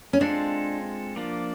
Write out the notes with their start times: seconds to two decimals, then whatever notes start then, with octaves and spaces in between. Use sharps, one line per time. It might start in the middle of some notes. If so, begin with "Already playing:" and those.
0.13 C#4
0.21 G#3 C4 D4 F4 A4
1.16 F3 A#3 D4 F4